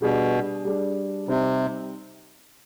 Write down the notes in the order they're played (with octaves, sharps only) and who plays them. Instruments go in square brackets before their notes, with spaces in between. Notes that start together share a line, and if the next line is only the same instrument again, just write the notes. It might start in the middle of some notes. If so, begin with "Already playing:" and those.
[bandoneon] B2 [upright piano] G3 D4 G#4
[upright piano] G3 D4 G#4
[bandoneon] C3 [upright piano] G3 C4 D#4 G4